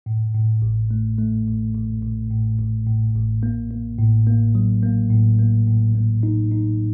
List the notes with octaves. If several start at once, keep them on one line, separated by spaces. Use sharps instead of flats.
A2
A2
A1
A3
A3
A1
A1
A1
A2
A1
A2
A1
A#3
A#3
A2
A#3
F#3
A#3
A2
A#3
A2
A#3
D#4
D#4